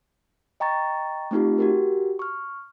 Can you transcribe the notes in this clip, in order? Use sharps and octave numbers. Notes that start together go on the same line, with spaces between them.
D#5 G5 A#5 C#6 A6
A3 C4 D#4 F4 G4
F#4 G4 A#4
C#6 F6